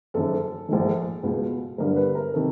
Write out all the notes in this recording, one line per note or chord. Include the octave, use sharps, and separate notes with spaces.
F#1 F#2 D#3 A4
A#1 G#2 D#3 A4
C#2 B2
G1 G2 D3 A#4
B4
A#4
C3 D#3 A4